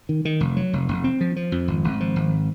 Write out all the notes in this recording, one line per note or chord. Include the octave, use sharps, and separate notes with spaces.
D#3
D#3
F1
F#3
F1
F1
C4
F3
F3
F2
G#1
G#1
F3
G#1